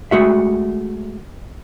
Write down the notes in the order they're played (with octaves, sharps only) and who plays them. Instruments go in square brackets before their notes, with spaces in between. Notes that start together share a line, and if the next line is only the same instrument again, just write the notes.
[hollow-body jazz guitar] G#3 A3 F#4 E5